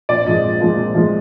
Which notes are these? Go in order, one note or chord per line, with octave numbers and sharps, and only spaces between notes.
A#1 D5
A#2 F3 G#3 D#5
A#1
A#2 F3 G#3
A#1
A#2 F3 G#3